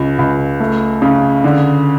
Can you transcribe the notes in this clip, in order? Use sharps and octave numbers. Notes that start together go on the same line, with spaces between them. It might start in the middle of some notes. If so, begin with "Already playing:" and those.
Already playing: C#2
C#2
A3
C#3
D3